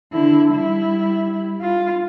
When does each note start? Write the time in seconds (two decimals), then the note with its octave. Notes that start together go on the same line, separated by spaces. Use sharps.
0.13 D3 E4
0.53 G3 E4
1.61 F4